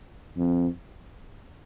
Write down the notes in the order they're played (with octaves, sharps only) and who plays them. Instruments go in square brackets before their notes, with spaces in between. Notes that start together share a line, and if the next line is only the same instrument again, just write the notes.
[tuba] F2